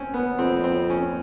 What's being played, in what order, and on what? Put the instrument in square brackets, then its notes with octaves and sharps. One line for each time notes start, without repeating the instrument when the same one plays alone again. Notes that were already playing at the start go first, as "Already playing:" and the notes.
Already playing: [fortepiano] C4 C#4
B3
[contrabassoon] F2 [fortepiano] C4
[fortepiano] C4
C#4